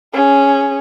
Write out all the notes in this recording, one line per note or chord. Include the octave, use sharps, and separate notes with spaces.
C#4 G#4